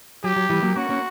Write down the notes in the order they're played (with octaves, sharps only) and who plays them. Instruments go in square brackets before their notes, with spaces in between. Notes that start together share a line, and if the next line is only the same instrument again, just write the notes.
[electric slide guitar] F#3 [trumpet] G4
[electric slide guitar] F#3
E3 G3
F#3 A#3
[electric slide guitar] A#3 C#4 [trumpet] F#4
[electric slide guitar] A#3 C#4